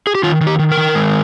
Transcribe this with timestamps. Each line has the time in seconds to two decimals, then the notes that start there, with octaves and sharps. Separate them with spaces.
0.07 G#4
0.15 G4
0.23 D#3 F4
0.41 D#3
0.47 G4
0.59 D#3
0.72 A#4
0.77 D#3
0.95 G#3